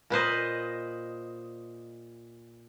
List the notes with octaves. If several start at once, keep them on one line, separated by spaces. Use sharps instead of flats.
A#2 B4 C5 D#5